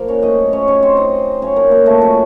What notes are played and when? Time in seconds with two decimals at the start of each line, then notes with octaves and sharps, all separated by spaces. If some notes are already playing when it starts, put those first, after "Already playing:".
Already playing: A#2 F3 A#3 A#4
0.08 C#4 C#5
0.22 A2 F#3 D#4 D#5
0.53 C#4 C#5
0.68 C#4 C#5
0.82 C4 C5
0.97 D#4 D#5
1.41 C3 F#3 C#4 C#5
1.56 A#3 A#4
1.71 A#3 A#4
1.86 A3 A4
2.01 F#3 F#4